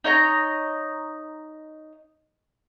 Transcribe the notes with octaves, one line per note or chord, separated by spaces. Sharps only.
D#4 C#5 D#5 A#5